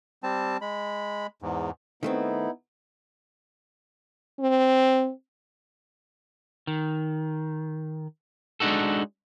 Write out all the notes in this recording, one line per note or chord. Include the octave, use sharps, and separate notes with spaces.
G3 C4 A5
G#3 B5
E2 G#2
D#3 A3 B3 C4 D#4 E4
C4
D#3
G#3 D4 D#4 F#4 A4